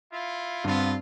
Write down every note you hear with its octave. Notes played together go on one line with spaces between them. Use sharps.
E4 F4
G2 B3 C4 F4